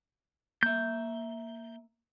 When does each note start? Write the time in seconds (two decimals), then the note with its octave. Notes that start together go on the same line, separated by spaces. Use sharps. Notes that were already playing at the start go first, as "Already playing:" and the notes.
0.63 A#3 E5 G6